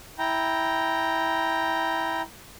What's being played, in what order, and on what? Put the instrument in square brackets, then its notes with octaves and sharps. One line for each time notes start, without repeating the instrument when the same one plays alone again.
[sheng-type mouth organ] E4 G5 A#5